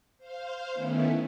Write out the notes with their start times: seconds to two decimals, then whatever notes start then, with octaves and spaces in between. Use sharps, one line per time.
0.18 C5 F5
0.72 D#3 A3 B3 C#4 E4